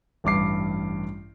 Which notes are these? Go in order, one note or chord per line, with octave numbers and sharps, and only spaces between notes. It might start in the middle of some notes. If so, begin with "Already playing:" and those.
A1 G2 D6 C7